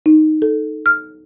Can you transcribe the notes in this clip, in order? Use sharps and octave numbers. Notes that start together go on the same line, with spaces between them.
D#4
A4
F6